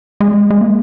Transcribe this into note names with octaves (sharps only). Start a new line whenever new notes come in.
G#3
G#3
A#3